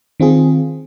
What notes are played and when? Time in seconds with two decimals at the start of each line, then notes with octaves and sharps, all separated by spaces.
0.20 D#3 C4 F4 G#4